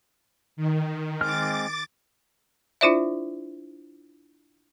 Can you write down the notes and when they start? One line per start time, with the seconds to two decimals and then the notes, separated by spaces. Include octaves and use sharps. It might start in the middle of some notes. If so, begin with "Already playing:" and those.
0.57 D#3
1.21 G#3 C4 D6 F6 A6
2.81 D4 E4 F4 C5 D5 E5